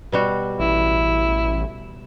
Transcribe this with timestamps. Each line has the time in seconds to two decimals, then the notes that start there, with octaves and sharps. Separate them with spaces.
0.12 B2 G3 F#4
0.59 A1 E4